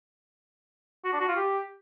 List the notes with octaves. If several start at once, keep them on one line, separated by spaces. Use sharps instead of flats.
F#4
D4
F#4
F4
G4